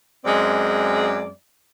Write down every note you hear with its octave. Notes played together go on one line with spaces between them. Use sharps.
F#2 G#3 C4 D5